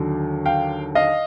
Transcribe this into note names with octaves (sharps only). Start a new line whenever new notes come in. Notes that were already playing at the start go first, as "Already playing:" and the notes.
Already playing: D#2 D3 F#3
F5 G5
D#5 F5